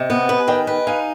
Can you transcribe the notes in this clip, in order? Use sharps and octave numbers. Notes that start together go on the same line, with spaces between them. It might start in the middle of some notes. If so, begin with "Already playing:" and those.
Already playing: C3 D#5
B3
B4
G#5
D#3 D#5 G5
B4
D#4 F5 G#5